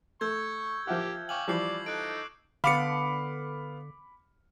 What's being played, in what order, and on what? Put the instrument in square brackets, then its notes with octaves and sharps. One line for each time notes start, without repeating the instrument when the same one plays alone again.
[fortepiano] A3 [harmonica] C#6 [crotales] E6 G6 G#6
[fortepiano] F3 E5 F#5 [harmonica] A#3 G4
[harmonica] F5 G5 G#5 [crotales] C#6 D6 F#7
[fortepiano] E3 F3 G3 [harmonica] D5 [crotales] D6 C7 F#7
[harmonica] D#4 A4 [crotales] F#6 D7
[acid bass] D3 [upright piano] B3 F5 [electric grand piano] B5 D6 C#7